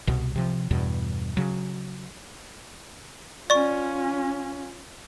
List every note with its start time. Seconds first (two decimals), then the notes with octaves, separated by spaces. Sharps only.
0.07 C2 B2
0.36 C3 F3
0.71 E2 G2 B2
1.37 C#3 F#3
3.50 C#4 F4 D5 C#6